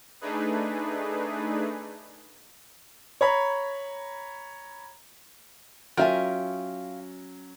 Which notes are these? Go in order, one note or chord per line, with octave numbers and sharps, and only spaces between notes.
A3 D4 D#4 G#4 B4
C#5 A#5 B5
F#3 C#4 F4 A#4 E5 G5 G#5